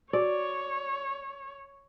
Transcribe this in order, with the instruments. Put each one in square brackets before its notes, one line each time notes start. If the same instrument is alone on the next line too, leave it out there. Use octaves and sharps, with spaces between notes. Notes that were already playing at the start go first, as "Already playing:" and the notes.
[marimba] F#4 [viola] C#5 [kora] D5